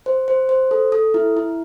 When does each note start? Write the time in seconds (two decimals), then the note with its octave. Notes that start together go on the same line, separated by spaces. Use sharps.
0.06 C5
0.28 C5
0.49 C5
0.71 A4
0.92 A4
1.14 E4
1.37 E4